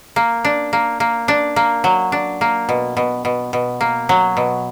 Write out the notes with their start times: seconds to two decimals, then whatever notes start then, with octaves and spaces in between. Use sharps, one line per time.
0.16 A#3
0.45 D4
0.73 A#3
1.00 A#3
1.28 D4
1.56 A#3
1.84 F#3
2.12 D4
2.41 A#3
2.69 B2
2.97 B2
3.25 B2
3.53 B2
3.81 A#3
4.09 F#3
4.37 B2